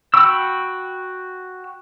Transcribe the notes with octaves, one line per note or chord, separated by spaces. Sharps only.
F#4 G5 B5 C#6 E6